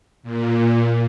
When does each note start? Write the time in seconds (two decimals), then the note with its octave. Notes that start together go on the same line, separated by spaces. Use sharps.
0.23 A#2